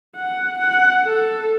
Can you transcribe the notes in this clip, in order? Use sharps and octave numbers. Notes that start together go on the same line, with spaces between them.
F#5
F#5
A4